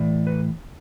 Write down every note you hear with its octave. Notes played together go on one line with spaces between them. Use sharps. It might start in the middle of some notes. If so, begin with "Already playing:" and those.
Already playing: A2 E3 D5
B4